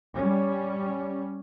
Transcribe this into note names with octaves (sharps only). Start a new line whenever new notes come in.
G3 C#4